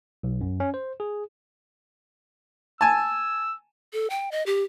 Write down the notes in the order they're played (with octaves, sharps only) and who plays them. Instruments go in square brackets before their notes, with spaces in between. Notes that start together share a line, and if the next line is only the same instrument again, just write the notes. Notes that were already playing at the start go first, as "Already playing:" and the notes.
[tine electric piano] B1
F#2
C#4
C5
G#4
[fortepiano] G#5 A5 [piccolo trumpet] E6
[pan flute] A4
G5
D#5
G4